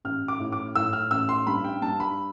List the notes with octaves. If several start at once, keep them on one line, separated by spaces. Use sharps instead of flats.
A1 F6
D6
A2
D6
A2 E6
F6
A1 E6
C6
G2 B5
G5
G2 A5
B5